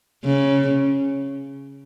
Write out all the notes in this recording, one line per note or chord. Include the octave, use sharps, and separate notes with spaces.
C#3